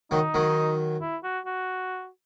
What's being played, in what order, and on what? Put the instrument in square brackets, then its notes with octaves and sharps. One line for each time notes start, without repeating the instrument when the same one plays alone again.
[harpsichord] D#3 F#3 [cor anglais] D#4
[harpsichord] D#3 F#3
[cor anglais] E4
F#4
F#4